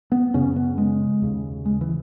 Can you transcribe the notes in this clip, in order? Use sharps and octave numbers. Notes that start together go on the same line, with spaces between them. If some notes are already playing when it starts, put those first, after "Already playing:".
B3
F#2 C#3 C#4
B3
G#3
D#2 C#3
G#3
E3